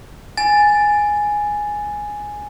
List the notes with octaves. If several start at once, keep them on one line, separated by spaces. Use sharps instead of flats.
G#5 A6